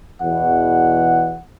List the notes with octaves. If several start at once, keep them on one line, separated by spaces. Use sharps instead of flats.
E2 B2 F#5